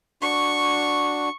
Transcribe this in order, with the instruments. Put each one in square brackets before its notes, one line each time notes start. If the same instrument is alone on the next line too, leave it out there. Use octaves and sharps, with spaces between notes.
[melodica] D4 F#4 [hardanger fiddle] C#6